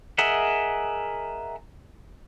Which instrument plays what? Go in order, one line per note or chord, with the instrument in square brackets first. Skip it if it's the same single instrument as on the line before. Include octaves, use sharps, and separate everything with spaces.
[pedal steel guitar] G#4 A#4 D#5 E5 F#5